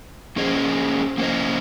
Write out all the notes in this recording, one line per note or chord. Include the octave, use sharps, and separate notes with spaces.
A#3 C#4 G#4 C5 D#5
A#3 C#4 G#4 C5 D#5